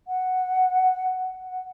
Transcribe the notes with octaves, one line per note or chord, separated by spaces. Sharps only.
F#5
F#5